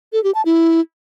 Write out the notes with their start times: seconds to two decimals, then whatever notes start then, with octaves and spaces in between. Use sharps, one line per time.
0.13 A4
0.24 G4
0.35 A5
0.45 E4